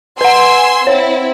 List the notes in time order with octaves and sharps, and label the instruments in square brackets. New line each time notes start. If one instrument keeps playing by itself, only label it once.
[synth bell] B4 F#5 [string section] G#5 C6 E6
[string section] C4 E4 [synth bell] C#5